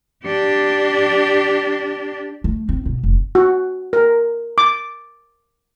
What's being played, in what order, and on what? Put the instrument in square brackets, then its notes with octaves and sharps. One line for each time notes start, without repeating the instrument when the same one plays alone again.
[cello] D4 G4
[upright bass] A3
C4
B2
F1
[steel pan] F#4
A#4
D6